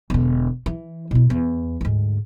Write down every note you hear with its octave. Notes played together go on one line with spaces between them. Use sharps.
E1 D3
E3
B2 E4
E2
D2 G#2